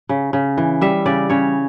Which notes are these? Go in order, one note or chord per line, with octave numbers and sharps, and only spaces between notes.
C#3
C#3
E3
G3 E5
C#3 D5
C#3 C#5